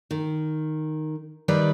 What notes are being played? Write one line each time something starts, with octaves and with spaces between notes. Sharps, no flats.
D#3
D#3 G3 B4 D5